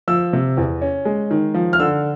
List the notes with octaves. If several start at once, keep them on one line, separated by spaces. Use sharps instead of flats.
F3 E6
C3
E2
C#4
G#3
D#3
F3
F6
D3 E6